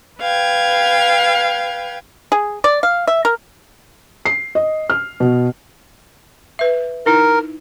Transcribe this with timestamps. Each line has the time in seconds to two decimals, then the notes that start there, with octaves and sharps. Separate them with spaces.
0.20 B4 F5 G5 G#6
2.32 G#4
2.64 D5
2.83 F5
3.07 E5
3.25 A#4
4.26 C7
4.55 D#5
4.90 F6
5.20 B2
6.59 B4 E5
7.06 D#4 E4 A#4